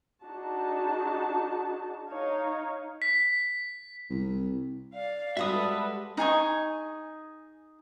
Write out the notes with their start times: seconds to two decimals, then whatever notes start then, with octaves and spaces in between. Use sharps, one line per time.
0.25 D4 D#4 F#4 G#4 A5
2.08 D#4 C#5 F5
3.02 B6
4.10 C2
4.94 D5 F5
5.37 G3 G#3 F#4 A4 B4 E5 D#6
6.17 D#4 G#4 G#5 C#6